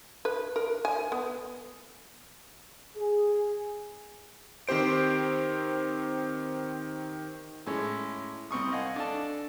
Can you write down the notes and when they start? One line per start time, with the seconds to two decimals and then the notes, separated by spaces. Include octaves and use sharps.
0.25 B4
0.56 A#4
0.85 G#5
1.12 B3
2.97 G#4
4.68 D#3 C4 G4 C5 D7
7.66 A2 G#3 C#4
8.51 C2 C4 C#6 D#6
8.71 D#5 F5 F#5 G#5
8.96 D4 A4 A5